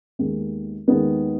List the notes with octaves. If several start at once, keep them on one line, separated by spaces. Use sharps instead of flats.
D#2 D#3 G#3 B3
D#2 D#3 G#3 B3